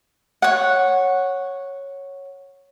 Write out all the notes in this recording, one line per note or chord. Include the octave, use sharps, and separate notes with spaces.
C#5 F#5